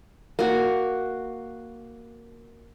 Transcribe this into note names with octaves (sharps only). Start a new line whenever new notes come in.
A#3 F#4